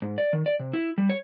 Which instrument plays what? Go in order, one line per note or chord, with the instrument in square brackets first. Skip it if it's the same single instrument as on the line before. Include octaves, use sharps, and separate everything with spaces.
[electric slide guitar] G#2
D5
D#3
D5
C3
E4
G3
C#5